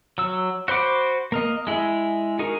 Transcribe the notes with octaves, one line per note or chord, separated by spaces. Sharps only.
F#3 E6
F#4 C5 B5 D6
A#3 A#4 D#5
G#3 E4 G#4
D#4 F#4 G#4 A#4